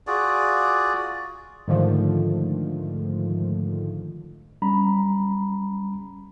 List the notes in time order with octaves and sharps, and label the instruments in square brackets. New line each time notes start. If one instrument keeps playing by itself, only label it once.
[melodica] F4 F#4 G#4 D5
[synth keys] G#2 D3 D#3 F3 A3
[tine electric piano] G3 C#4 A#5 B5